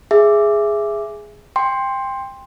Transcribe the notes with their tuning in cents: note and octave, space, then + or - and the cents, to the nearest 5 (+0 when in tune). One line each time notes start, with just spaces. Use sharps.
G#4 +0 E5 +15
G5 +20 C6 +10